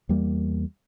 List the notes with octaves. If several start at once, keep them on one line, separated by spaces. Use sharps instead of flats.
E2 G3 A#3